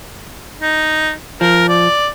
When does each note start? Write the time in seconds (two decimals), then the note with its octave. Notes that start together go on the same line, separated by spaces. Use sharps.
0.61 D#4
1.41 F3 A#4
1.69 D5